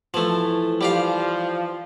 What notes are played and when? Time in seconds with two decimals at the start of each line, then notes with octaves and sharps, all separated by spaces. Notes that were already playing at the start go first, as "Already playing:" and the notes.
0.14 E3 F3 A3
0.81 F3 G3 G4 F5